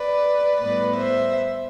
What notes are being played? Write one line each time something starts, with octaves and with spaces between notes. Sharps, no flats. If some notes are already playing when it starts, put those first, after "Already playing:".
Already playing: B4 D5
A2 G3 B3 B4 D5
C5 E5